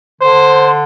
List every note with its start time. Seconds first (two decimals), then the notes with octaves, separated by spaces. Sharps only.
0.21 D3 C5